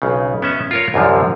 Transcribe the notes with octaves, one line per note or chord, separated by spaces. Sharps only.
B1 C#3
B3 C#4 E5
F4 A#4 C#5
C2 F#2 D3 F3